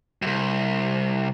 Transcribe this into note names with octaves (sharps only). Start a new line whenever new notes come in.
C2 F#2